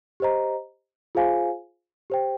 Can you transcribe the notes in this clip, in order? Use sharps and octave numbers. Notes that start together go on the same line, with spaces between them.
G4 C5 D#5 A#5
F4 G#4 C5 F5 G#5
G4 C5 G5